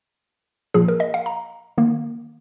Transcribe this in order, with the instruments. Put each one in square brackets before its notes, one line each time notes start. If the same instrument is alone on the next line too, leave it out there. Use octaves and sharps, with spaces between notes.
[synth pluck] A#2 F3 A#3 G#4
A#4
D#5
F5
A#5
D#3 A#3